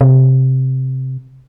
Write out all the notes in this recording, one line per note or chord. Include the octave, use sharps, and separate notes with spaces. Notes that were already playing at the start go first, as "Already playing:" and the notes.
C3